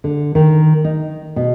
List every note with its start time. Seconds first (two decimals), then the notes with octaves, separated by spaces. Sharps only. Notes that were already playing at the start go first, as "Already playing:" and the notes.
0.04 D3
0.35 D#3
0.84 D#4
1.36 B2